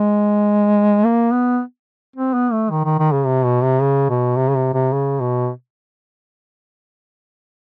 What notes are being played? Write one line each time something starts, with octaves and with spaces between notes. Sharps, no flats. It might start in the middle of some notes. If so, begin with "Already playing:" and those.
Already playing: G#3
A#3
B3
C4
B3
A3
D#3
D#3
D#3
C#3
C3
B2
C3
C#3
B2
C3
C#3
C3
C3
C#3
B2